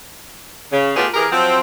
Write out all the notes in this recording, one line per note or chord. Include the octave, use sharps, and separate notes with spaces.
C#3
A3 B3 F4 G4 G#4
E3 G4 G#4 A#4
F3 F#3 C4